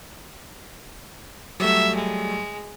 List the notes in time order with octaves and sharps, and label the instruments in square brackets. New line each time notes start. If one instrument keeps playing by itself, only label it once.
[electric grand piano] F#3 G3 A3 [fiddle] E5
[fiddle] G#3